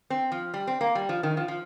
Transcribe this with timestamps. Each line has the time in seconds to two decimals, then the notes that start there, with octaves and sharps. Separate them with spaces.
0.10 C4
0.32 F3
0.54 G3
0.67 C4
0.81 A#3
0.95 G3
1.09 F3
1.23 D#3
1.37 F3
1.48 F3